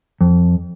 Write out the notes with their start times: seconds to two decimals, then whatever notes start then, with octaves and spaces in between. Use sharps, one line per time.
0.21 F2